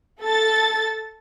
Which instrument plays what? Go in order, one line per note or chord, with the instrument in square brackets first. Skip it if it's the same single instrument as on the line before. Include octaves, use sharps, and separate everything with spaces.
[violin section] A4 A6